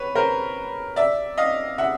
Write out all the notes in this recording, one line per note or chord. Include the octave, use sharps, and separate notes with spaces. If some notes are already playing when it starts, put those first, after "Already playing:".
Already playing: B4 C#5
A#4 C5
D5 E5
D#5 F5
E5 F#5